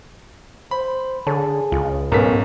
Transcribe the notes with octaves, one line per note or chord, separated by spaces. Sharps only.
C5 B5
D3 G#4 A4 C#5 A5
C#2 F4
B1 G#2 B3 C#4 A4 A#4 B6